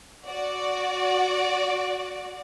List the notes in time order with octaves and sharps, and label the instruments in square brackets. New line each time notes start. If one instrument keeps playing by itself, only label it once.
[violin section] F#4 D5